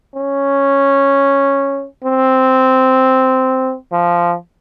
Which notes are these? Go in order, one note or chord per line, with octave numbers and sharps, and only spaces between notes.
C#4
C4
F3